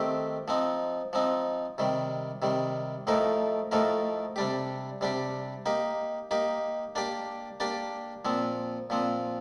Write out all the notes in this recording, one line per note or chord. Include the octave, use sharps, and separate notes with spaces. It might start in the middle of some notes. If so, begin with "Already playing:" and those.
Already playing: D#3 A3 C4 G4
F3 C4 D#4
F3 C4 D#4
C3 D#3 G3
C3 D#3 G3
A2 F3 A3 D#4 A#4
A2 F3 A3 D#4 A#4
C3 G3 D4 G4
C3 G3 D4 G4
A#3 D#4 G4
A#3 D#4 G4
A#3 D4 G4 D5
A#3 D4 G4 D5
A#2 F3 C4
A#2 F3 C4